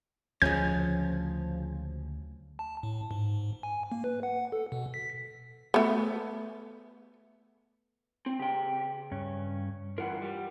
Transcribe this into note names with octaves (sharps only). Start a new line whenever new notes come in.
D2 C#3 F3 F#3 G#3 C#4 G6
A5
A2
G#2
G#5
A#3
B4
F#5
A4
B2
B6
A3 B3
C4
C#3 G4 G5
G2 C#4
D2 E3 F4 A#4 F#5
G3